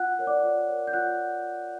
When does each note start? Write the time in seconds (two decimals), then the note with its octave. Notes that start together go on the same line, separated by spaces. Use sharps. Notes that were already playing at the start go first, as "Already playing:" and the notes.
Already playing: F4 F#5 F#6
0.19 A#4 C#5
0.27 D5 D6
0.43 F4
0.68 A#4 C#5
0.87 G6
0.93 F4 F#5 F#6